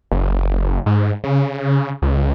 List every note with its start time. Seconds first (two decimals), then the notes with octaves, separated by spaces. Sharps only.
0.12 F#1
0.86 G#2
1.24 C#3
2.02 C#2